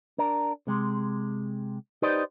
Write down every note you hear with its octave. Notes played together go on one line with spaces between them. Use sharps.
D4 A#4
C3 G#3
D#4 G4 B4 C5 D5 D#5